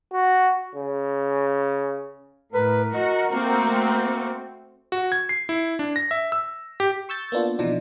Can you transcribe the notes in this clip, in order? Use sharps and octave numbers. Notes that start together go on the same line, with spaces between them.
F#4
C#3
A2 A#4 B4
F#4 D#5
A3 A#3 C4 F#4
F#4
G#6
C7
E4
D4
A#6
E5
E6
G4
C#6 E6 G6 A6
A#3 B3 D4 F4
B2 E3 F3 D4 D#4 F4